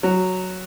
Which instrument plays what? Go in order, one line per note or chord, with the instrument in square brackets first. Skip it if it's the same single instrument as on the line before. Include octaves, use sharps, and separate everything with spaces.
[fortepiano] F#3